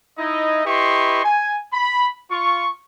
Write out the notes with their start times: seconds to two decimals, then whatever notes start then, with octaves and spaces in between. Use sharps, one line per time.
0.18 D#4 E4 D#5
0.66 E4 G4 B4 D#5 C6 C#6
1.24 G#5
1.73 B5
2.31 F4 C#6